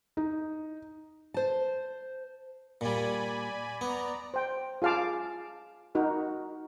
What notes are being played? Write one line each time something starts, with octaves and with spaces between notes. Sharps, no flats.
D#4
C5 A5
A#2 G3 D5 G#5 B5
B3 D5 A#5
C5 G5
F4 G#4 F5 A5 D6
D#4 F#4 A#4